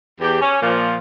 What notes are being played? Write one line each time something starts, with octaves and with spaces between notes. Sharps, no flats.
E2 G4
C#4
A#2 F3